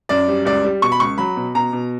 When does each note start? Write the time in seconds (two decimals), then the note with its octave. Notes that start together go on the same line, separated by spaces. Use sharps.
0.09 F#2 D5
0.28 G3
0.45 C#2 D5
0.65 G3
0.82 B2 C#6
0.92 B5
1.00 C#2 C#6
1.18 F#3 B5
1.36 B2
1.55 B2 A#5
1.73 B2